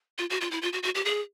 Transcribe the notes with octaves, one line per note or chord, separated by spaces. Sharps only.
F4
F#4
F4
E4
F4
F#4
F#4
G4
G#4